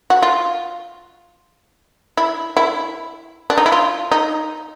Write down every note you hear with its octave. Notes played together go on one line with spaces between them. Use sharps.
F#4
F4
E4
E4
D4
D#4
E4
F4
D#4